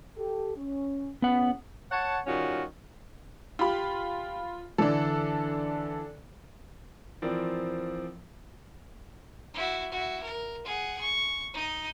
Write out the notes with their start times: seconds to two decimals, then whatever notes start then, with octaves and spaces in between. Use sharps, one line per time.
0.17 G4 A4
0.56 C#4
1.22 E2 B3 C#4 F#5
1.91 C#5 F#5 A5
2.26 D#3 G3 C#4 F4 F#4
3.59 F4 G4 B5
4.78 D3 E3 D4 A4
7.22 E3 F3 C4 A#4 D5
9.54 E4 F#4
9.92 E4 F#4
10.23 A#4
10.65 G#4 F#5
11.01 C#6
11.54 D#4 D#5